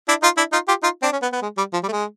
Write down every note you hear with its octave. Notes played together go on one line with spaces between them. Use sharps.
D4 E4
D#4 F4
D4 E4
D#4 F4
F4 G4
D#4 F4
C4 D4
C#4
B3
B3
G#3
G3
F3
G3
A3
G#3